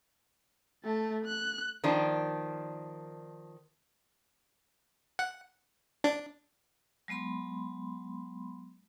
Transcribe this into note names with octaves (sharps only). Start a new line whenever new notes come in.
A3 A5
F#6
D#3 F3 A#3 D4
F#5
D4
F#3 G#3 B3 B5 C6